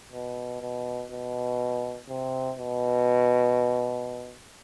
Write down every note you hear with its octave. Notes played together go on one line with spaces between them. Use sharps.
B2
B2
B2
C3
B2